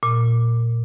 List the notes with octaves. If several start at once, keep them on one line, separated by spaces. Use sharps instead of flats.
A#2